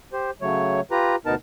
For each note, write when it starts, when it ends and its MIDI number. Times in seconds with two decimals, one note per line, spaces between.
0.13 0.31 67
0.13 0.31 72
0.41 0.81 49
0.41 0.81 54
0.41 0.81 57
0.41 0.81 73
0.91 1.16 65
0.91 1.16 67
0.91 1.16 71
0.91 1.16 82
1.26 1.35 38
1.26 1.35 47
1.26 1.35 59
1.26 1.35 63
1.26 1.35 70
1.26 1.35 81